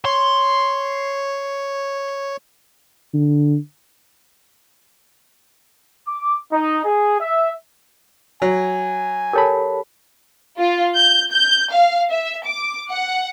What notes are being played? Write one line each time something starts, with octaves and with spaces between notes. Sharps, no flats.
C#5 C6
D3
D6
D#4
G#4
E5
F#3 G#5
G4 A4 A#4 C#5 A5 B5
F4
G6
G6
F5
E5
D6
F#5